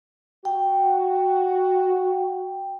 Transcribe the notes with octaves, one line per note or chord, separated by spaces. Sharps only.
F#4 G5